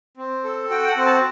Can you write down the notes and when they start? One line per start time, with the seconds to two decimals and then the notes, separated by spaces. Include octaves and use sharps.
0.17 C4
0.44 A4
0.70 F#4 G5
0.83 G5
0.88 F#5
0.97 C4
1.06 A5